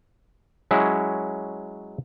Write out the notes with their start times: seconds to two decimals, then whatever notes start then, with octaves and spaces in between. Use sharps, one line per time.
0.71 F#3 G#3 C#4 E4